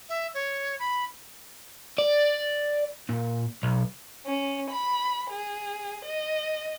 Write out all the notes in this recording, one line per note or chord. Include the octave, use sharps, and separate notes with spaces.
E5
C#5
B5
D5
A#2
B1
C#4
B5
G#4
D#5